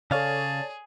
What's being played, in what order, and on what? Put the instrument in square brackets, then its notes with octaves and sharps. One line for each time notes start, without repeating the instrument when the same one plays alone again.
[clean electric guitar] C#3 F5 [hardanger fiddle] G#4 [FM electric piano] A4 C#5 D5 [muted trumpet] A5